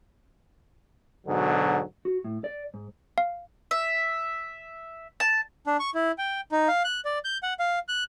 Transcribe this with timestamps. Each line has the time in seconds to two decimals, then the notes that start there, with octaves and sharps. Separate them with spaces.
1.27 G#2 B2 D3 F#3
2.05 F#4
2.24 A2
2.44 D5
2.74 G#2
3.18 F5
3.71 E5
5.20 A5
5.67 D4
5.80 C#6
5.95 E4
6.18 G5
6.52 D#4
6.68 F5
6.84 F#6
7.05 D5
7.24 G6
7.43 F#5
7.59 F5
7.88 F#6